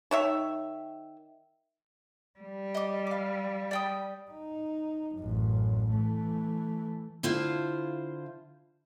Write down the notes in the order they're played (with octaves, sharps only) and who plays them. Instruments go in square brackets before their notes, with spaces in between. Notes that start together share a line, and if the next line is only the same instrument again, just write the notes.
[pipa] D#3 C#5 E5
[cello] G3
[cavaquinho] D#5 D6
F5 D6
D5 G5 D#6
[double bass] D#4
A1 F#2
E3 A3
[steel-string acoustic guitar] D3 E4 F4 C5 F5